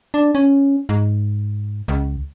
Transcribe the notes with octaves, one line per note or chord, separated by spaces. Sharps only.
D4
C#4
G#2
C#2